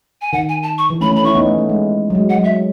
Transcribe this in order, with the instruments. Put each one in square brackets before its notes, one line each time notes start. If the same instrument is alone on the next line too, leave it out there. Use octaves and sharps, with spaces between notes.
[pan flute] G#5
[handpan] D#3 [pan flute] F#5
[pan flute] G#5
A5
C#6
[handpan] E3
[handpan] A3 C#4 [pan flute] B5
[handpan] A3 C#4
[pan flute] B5
[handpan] C#4 E4 [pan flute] C#6
[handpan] B3 D#4
A3 C#4
A3
G#3
F#3
G#3
[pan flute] F#5
[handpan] F#3
[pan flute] E5